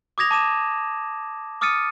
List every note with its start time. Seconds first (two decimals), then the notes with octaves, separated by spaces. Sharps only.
0.18 D6 D#6 G#6 A#6 F7
0.31 A5 D6 D#7 E7
1.61 D6 D#6 F6 A6 C#7 D#7